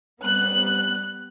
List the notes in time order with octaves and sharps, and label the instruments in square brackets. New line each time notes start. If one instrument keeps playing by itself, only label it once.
[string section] G3 B3 F#6